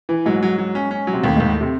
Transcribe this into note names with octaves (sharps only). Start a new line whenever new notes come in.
E3
G#2 F#3
F#3
F#3
C#4
C#4
F#3
C3
D#2 A2
D#2 G#2
A2
C3